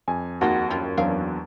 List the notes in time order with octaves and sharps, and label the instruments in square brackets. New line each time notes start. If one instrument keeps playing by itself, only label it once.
[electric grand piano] F2 [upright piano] G#5
[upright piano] D#2 [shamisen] G#3 D#4 F4 [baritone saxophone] F#4
[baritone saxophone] F#2 [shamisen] G3 E4 F4
[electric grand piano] E2 F#3 D4 [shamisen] C4 A#4 F5